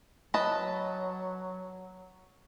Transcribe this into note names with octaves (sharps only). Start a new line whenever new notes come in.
F#3 B4 D#5 A5